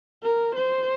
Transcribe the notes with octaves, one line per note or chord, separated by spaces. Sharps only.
A#4
C5